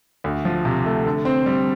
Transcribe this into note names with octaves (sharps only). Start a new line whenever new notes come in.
D2
F3
C3
A3
D3
C4
G3